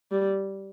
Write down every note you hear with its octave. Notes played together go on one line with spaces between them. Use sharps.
G3